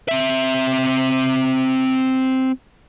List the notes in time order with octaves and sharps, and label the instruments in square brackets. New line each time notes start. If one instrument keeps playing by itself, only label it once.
[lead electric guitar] C4 E5